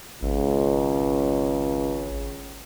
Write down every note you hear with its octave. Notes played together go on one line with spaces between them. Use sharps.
G#1 C#2